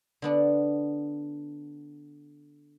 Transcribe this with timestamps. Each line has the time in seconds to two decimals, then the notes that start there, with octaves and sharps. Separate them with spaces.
0.22 D3 B3 D4